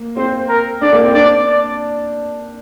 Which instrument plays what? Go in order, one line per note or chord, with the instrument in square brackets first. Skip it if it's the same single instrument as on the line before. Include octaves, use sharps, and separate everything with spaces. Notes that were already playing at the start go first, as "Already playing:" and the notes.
Already playing: [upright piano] A#3
[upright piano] C4 [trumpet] C5
[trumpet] A#4
[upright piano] D4 [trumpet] D5
[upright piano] A#3
C4
[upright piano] D4 [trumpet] D5
[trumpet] D5